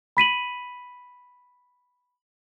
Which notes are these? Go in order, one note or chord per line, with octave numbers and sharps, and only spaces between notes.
B5 B6 D#7 F#7